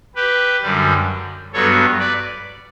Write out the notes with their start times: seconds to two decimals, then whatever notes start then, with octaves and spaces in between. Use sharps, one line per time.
0.16 G4 B4
0.62 F#2 D3 G3
1.53 G2 F#3 B3 A4 C#5
1.99 B4 D5